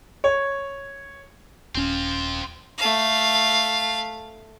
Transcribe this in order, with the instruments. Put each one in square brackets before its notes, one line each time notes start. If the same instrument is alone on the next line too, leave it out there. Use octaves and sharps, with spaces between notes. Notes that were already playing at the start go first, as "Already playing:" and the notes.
[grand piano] C#5
[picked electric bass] D#1 C#4 [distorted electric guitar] C4 F4
[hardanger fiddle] A3 F5